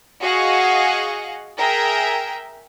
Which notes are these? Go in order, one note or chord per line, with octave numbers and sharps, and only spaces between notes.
F#4 G#4 D#5 F5 F#5
G#4 A#4 E5 G5